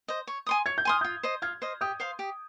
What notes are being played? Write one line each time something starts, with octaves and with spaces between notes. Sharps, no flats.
C5 D#5
C#5
G#5 C6 D#6
C#5 G#6
G6
G#5 C6 D#6 F6
F4 D#6 G6
C5 D#5
F4 F6 G#6
C5 D#5
G4 D#6 G6
C5 F5 C6
G4